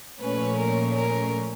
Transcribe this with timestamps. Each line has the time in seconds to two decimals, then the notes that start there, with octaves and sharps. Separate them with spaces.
0.20 A#2 F3 A3 C#4 B4
0.58 A#4
0.97 A#4